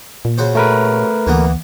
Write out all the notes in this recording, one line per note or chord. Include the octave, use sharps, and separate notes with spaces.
A#2
C#3 F#4 C5
A3 A#4 B4
D2 E3 A#3 B3